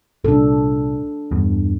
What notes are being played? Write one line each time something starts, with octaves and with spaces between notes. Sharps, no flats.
C2 A#2 D4 A4
E2 G2